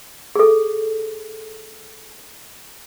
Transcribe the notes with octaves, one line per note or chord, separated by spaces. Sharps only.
G#4 A4